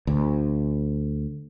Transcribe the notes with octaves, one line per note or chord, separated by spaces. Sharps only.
D2